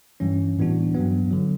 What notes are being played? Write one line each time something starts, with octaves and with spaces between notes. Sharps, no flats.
G2 E3 G3 C#4
A2 E3 B3 D4 F#4
G2 F#3 B3
D3 F#3